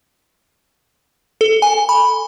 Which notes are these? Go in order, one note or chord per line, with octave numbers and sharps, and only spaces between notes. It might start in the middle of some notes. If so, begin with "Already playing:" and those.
A4
G#5
B5